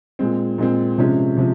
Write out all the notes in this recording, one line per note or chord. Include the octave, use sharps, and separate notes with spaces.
A#2 G#3 C4
A#2 G#3 C4
C3 F3 G#3 C#4
C3 F3